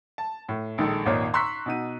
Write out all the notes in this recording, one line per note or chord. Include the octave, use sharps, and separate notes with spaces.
A5
A2
A#1 D#3 G#3 A4
G#1 D#2 A#2 D#4 C#5
A#5 C6 C#6 E6 F#6 B6
B2 D#4 D#7